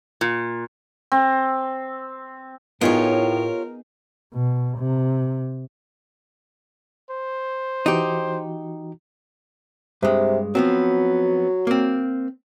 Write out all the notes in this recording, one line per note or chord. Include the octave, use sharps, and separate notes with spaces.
A#2
C4
A2 B3 D#4 F4 G4 G#4 A#4 C#5
B2
C3
C5
E3 D#4 F#4 G4
G2 C3 G#3
F3 F#3 B3 C4
A#3 C4